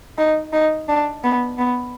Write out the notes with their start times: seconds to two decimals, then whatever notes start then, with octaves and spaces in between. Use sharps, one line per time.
0.18 D#4
0.53 D#4
0.88 D4
1.24 B3
1.58 B3